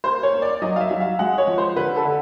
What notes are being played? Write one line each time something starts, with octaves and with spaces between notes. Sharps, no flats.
A#3 C5
C#5
A#3
D5
F#3 D#5
F5
E5
F#3
F5
G#3 F#5
C#5
F3
C5
D3 B4
A4
D3